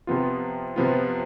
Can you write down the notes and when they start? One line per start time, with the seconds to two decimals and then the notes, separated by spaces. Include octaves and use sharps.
0.07 C3 F3 B3 F4
0.76 C3 F3 B3 F4